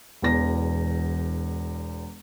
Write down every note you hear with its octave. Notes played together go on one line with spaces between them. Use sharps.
E1 E2 A#6